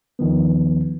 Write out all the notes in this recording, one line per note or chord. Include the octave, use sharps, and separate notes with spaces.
D#2 D#3 F3 B3